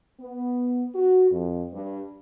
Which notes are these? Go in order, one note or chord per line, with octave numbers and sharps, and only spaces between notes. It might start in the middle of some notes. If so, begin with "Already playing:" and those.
B3
F#4
F2
G2